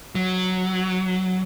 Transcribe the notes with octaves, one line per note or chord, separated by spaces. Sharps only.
F#3